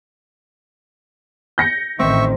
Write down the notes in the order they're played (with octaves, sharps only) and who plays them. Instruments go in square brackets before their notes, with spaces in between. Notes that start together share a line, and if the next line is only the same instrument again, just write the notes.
[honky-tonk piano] G6 A#6 C#7
[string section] A1 D#3 [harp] C4 [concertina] E5 C#6